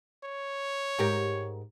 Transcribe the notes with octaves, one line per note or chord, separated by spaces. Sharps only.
C#5
G#2 G4 A#4